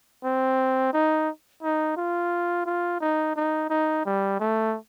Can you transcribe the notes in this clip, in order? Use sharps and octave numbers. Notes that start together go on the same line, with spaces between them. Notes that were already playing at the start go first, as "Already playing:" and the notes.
C4
D#4
D#4
F4
F4
D#4
D#4
D#4
G3
A3